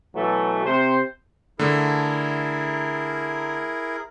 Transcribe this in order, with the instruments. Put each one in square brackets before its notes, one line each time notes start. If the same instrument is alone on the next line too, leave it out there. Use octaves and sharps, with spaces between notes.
[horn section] B2 E3 F#3 A3
C3 C5
[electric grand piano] D3 A3 [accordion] E4 G#4 A#4